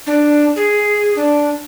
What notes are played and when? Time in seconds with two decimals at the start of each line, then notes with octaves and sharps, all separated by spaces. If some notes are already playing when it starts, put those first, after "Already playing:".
0.07 D4
0.56 G#4
1.16 D4